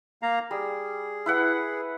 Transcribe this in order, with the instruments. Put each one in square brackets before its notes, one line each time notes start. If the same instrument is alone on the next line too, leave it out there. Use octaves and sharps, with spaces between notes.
[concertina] A#3 F5 A#5
[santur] G3 [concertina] G#4
[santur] E4 B4 F#5